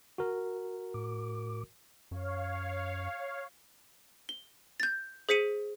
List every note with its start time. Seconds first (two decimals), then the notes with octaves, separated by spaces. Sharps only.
0.18 F#4 A#4
0.94 A2 D6
2.11 F#2 C#5 F5
4.29 G7
4.80 G6 A6
5.29 G#4 C5 B6 C#7 D#7